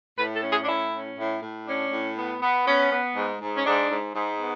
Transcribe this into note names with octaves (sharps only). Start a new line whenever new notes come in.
A2 B4
A4
C#4
G#4
D4
A2 E4
C#4
A2
A2
C#4 D4
A2
B3
B3
B3 C#4
B3
G#2
G#2
C#4
G#2 D4
G#2
G#2
B3